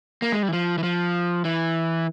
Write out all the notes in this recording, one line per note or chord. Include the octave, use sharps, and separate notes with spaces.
A#3
G#3
G3
E3
F3
E3
F3
E3